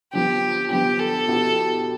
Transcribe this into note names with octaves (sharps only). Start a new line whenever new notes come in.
D3 F3 B3 G4
D3 F3 B3 G4
A4
B2 B3 E4 G4